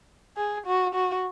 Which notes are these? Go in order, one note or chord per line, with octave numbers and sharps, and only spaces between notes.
G#4
F#4
F#4